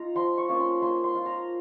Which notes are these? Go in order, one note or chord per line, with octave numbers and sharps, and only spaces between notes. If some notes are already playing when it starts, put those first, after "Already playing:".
Already playing: D#4 F4 A#5
F3 C6
C#6
A#3 C#4 F4
C6
A#3 C6
C6
F4
A#5